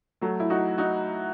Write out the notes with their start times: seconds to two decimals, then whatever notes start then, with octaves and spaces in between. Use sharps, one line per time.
0.21 F#3 A3
0.40 E4
0.50 D#4 F#4
0.78 D#4 F#4